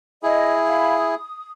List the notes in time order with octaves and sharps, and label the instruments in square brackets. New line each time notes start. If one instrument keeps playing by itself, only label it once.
[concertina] E4 G#4 [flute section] D#5
[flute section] F5 B5
D#6